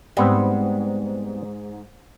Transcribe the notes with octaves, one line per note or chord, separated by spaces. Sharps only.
G#2 G3 B3 C4